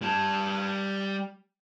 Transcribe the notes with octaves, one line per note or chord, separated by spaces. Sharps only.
G3 A5